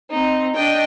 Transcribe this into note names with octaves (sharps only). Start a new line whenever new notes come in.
C4 D#4
D4 D#5 G5